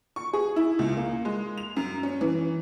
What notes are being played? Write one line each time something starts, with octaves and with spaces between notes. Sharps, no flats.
C#6
G#4
E4
C#2
A#3
G#3
F7
F#2
C#4
E3